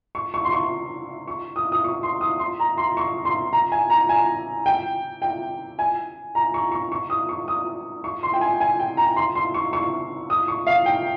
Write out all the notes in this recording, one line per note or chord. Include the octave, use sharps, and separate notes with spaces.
C#6
C#6
C6
C#6
C#6
D#6
D#6
C#6
C6
D#6
C6
A#5
C6
C#6
C6
A#5
G#5
A#5
G#5
G5
G5
G#5
A#5
C#6
C#6
C#6
D#6
C#6
D#6
C#6
C6
G5
G#5
G#5
G5
A#5
C6
C6
C#6
C#6
D#6
C#6
F5
G5